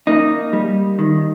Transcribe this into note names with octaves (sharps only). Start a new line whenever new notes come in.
A#3 D#4
G3
D#3